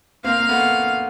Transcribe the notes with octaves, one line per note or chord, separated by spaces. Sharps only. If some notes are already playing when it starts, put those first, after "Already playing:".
A#3 C4 F5
A#3
A3 B3